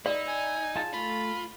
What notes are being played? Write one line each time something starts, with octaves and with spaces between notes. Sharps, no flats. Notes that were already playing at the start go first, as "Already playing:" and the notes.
D#4 D5 E5 B5
G#5
F4 G#4 A5
A3 F4 B5